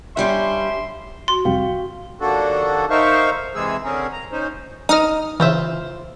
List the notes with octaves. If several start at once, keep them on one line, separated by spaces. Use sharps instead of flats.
G2 G3 C#4 E5 C6
F#4 C6
C2 F2 C3 F5 G5
D#2 A#3 D4 F#4 A4
D#4 A#4 C5 E5 F5 C#6
C3 E3 G#3 G#4 E6
D3 C4 C#4 G#4 A#4
A#5
C#4 D#4 C5
D#4 D#5 D#6 F6
C#3 E3 F4 C5 E5